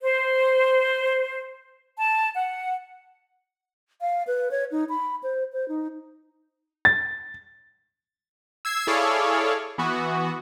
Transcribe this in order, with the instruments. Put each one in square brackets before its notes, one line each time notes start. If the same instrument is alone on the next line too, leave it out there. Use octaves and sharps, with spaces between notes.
[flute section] C5
A5
F#5
[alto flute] F5
B4
C#5
D#4
B5
C5
C5
D#4
[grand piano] A6
[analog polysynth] E6 G#6 C7
E4 G#4 A4 C#5 D5 F5
E3 B3 F#4